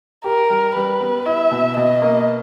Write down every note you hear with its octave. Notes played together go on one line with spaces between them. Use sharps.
G4 A#4
G3
G3 B4
B3
E4 E5
B2
B2 D#5
A#3